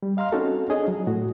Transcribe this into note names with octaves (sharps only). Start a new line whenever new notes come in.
G3
D#5 F5 A#5 C6 F6
C4 C#4 D#4 F#4 A4
D4 G#4 C#5 D#5
F#3
A2 F#4